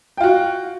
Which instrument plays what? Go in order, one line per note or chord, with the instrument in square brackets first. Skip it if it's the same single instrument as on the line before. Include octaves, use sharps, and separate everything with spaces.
[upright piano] G5
F4
F#4